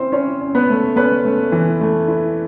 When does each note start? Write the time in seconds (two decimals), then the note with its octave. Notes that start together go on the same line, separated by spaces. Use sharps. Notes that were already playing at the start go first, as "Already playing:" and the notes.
Already playing: C4 C#4 E4 C5
0.12 C#4 E4 C#5
0.41 C#4
0.55 B3 B4
0.69 A3
0.96 B3 C#4 B4
1.25 A3
1.52 E3
1.81 A3
2.08 E4